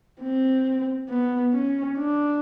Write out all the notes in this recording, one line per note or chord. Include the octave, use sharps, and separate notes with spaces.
C4
B3
C#4
D4